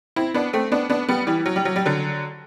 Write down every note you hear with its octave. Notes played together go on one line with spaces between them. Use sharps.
C4 E4
B3 D4
A3 C4
B3 D4
B3 D4
G3 B3
E3 G3
F#3
G3
F#3
G3
D3 F#3